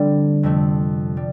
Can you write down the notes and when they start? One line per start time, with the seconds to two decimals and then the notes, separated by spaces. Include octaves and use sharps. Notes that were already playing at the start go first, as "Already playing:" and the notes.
Already playing: D3 G3 C4
0.43 F2 C3 A3
1.17 G3